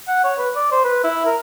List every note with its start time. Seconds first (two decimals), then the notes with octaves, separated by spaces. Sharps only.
0.08 F#5
0.24 C#5
0.38 B4
0.55 D5
0.72 C5
0.84 B4
1.04 E4
1.25 A#4